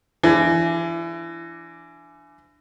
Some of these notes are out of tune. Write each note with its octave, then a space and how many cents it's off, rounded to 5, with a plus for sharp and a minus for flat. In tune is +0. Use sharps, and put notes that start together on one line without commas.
E3 +30 D4 +5